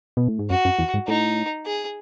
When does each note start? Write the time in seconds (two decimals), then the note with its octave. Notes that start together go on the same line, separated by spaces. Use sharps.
0.17 B2
0.28 A2
0.39 G#2
0.50 F#2 F#4
0.65 F#2
0.79 E2
0.94 G#2
1.07 A2 D#4
1.66 G#4